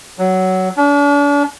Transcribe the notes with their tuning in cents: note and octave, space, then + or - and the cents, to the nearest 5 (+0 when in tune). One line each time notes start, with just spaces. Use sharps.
F#3 +15
D4 -40